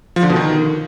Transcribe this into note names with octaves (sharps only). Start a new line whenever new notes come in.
F3
D3
B2
D#3